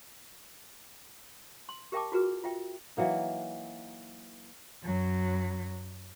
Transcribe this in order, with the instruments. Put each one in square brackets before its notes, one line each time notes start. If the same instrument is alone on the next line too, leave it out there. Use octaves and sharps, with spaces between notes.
[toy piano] C6
G4 A#4 E5 G5 A5 D6
F4 F#4 G#4 A#4 B4
F4 E5 G5
[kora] E3 F#3 A#3 D#4
[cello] F#2 F#3